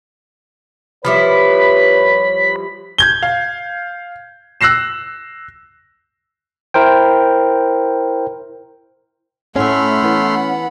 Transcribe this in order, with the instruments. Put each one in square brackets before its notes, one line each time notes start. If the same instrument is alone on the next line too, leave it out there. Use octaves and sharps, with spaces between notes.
[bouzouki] F3 G3 E4 [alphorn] B4 [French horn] C#5 [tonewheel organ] B5
[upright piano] G6 G#6 G7
F5
E6 F#6 A#6 C7 E7
[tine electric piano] E4 A#4 C5 G5
[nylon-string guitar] A2 E5 [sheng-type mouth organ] A3 C6 F6 [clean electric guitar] C#4 [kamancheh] F#5 B5
[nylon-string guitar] E3 B3